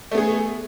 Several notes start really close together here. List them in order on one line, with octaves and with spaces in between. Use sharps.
A3 B3 G#4